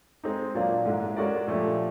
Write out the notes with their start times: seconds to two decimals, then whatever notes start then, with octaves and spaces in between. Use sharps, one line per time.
0.24 G#3 C4 D#4
0.54 A#2 F#3 A#3 D4 F4
0.85 G#2 E3 G#3
1.16 G#3 C#4 F#4 A#4 D5
1.47 A#2 F3 A3 D4 G4